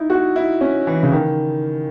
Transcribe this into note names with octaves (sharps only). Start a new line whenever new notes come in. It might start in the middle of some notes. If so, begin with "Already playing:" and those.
Already playing: D#4 E4
F#4
E4
C#4
E3
C#3
D#3